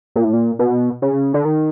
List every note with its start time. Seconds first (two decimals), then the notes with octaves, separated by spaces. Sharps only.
0.16 A#2
0.24 A2
0.33 A#2
0.59 B2
1.02 C#3
1.34 D3
1.45 D#3